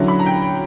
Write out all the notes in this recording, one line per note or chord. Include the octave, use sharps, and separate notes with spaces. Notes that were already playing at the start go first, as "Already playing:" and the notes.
Already playing: D3 F#3 C#4 E4
B5
A#5
G5